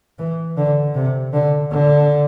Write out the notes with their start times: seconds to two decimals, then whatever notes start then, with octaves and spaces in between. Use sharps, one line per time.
0.19 E3
0.57 D3
0.95 C3
1.33 D3
1.72 D3